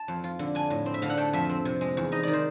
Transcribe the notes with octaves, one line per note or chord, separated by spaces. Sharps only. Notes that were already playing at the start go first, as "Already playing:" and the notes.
Already playing: A5
F2
F4
D3
D4 G#5
A2
C4
E5
D3 F5
F#5
A3 G5
F2 E5
C4
C3
G#3
E2
D#4 D#5
D#3 D5
C5